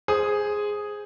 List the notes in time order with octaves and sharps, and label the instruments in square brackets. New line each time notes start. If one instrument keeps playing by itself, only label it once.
[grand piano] G#4 C5 D#6